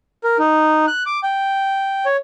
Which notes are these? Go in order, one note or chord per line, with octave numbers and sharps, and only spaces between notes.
A#4
D#4
F#6
D6
G5
C#5